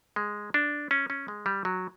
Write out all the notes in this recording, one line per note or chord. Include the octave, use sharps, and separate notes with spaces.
G#3
D4
C#4
C#4
G#3
G3
F#3